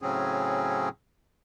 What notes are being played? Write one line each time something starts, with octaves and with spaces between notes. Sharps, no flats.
A2 C#3 F#3 C4 C#4 G#4